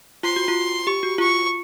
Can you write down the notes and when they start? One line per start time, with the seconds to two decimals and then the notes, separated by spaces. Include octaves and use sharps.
0.23 F4 C6
0.36 F#4
0.48 F4
0.87 G4 C#6
1.03 F#4
1.18 F4 C#6